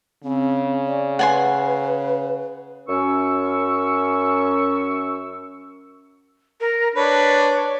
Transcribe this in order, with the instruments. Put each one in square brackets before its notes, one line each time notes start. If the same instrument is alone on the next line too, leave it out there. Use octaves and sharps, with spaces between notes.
[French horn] C#3 [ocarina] C4
[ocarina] D5
[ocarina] B4 [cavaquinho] F#5 G#5 C6
[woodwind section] F#2 C#4 C#6 E6
[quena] A#4
[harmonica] D4 B4 [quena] C#5